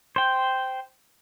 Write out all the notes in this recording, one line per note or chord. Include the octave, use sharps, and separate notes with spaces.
C5 G5